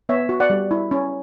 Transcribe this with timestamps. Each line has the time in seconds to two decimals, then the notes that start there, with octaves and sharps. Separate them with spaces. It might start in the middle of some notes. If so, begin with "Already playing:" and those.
0.09 B3 C#5 E5
0.29 F#4
0.40 D5 F#5
0.50 G3
0.71 E4
0.91 C#4